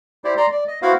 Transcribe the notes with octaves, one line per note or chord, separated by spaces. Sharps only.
E4 G4 C5 D5
D5 A#5 C6
D5
D#5
B3 E4 F#4 C5 F5